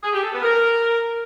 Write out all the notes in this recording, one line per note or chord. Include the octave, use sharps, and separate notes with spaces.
G#4
G4
A4
B3
A#4